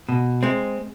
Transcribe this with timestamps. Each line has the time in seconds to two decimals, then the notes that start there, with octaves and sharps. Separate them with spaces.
0.09 B2
0.43 G#3 C4